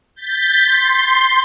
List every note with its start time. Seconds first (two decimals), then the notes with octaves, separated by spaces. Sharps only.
0.16 G6 A6 B6
0.67 C6